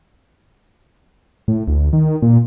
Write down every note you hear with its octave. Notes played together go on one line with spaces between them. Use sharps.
A2
D2
D#3
A#2